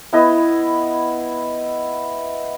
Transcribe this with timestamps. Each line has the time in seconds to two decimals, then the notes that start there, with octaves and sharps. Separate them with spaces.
0.13 B3 E4 B4 D#5